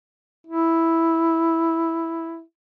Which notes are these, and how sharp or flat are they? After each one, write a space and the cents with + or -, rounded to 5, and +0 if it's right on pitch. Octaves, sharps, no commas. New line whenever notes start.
E4 -5